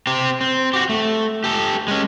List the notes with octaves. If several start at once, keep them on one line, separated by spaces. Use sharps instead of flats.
C4 G4
C4
F#4 G4
A3
G4 A4
G#3 C#4